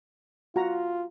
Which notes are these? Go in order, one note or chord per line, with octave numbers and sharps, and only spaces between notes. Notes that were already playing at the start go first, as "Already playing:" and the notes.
F4 F#4 A#5